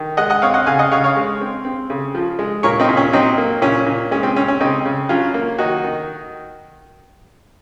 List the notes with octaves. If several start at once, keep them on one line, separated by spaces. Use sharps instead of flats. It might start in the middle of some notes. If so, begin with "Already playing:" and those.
Already playing: D#3
G#3 D#5 F#5
D#5 F#5
C4 C#5 F5
D#5 F#5
C#3 F5 G#5
D#5 F#5
C#3 C#5 F5
C#5 F5
G#3
C4
C4
C#3
F3
G#3
A#2 A#4 C#5
C4 D#4
A#2
C#4
F#3 C4 D#4
A#3
A#2 C#4
A#2
G#3 C#4
C4
C4 C#4
C#4
C#3 C4 D#4
C#3
F#3 C#4 F4
A#3
D#3 D#4 F#4
D#3